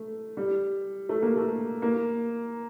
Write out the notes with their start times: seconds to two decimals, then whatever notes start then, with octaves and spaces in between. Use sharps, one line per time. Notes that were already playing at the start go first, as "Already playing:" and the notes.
Already playing: A3
0.37 G3
1.09 A3
1.22 A#3
1.36 A3
1.82 A#3